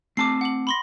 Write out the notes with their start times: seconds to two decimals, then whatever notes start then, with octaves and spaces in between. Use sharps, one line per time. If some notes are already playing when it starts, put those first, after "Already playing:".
0.17 A3 C4 A5 D6 C7
0.41 F#5 D6 F#7
0.67 B5 C6 A#6